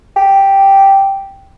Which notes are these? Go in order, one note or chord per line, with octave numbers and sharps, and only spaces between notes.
G4